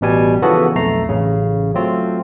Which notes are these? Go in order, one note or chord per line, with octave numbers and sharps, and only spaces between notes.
A1 B2 G3 G#5
C#3 E3 F3 B3 F#4 A4
B1 F2 A3 A#5 C7
A1 C#3
F#3 A3 C4 F4